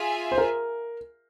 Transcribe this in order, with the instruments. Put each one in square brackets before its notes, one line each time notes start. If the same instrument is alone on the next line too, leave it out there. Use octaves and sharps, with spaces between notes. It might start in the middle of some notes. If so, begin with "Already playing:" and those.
Already playing: [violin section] F4 G#4 E5 G#5
[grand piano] C5
A#4